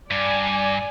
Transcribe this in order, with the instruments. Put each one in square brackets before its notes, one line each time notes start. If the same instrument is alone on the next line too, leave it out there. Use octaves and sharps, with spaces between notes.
[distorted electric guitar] G2 [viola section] D5 G#5